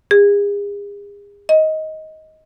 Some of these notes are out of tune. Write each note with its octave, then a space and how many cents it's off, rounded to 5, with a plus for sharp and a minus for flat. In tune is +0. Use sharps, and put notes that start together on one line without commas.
G#4 -40
D#5 +15